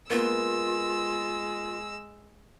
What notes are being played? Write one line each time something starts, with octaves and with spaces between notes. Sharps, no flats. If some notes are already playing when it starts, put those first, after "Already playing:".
G#3 A#3 B3 F4 E6